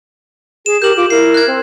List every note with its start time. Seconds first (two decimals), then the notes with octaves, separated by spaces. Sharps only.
0.66 G#4 E7
0.82 G4 A#4 G6 F#7
0.97 F4 D6
1.10 E4 A#4 C7
1.34 F#6 G#6
1.47 C4